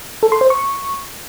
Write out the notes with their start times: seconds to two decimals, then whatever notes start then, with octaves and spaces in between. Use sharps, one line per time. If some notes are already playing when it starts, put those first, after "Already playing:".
0.23 A4
0.32 C6
0.41 C5
0.50 C#6